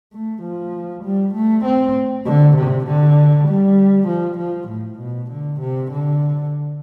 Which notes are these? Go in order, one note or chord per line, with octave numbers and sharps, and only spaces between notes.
A3
F3
G3
A3
C4
D3
C3
D3
G3
F3
F3
A2
B2
D3
C3
D3